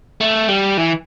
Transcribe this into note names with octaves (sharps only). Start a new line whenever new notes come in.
A3
G3
E3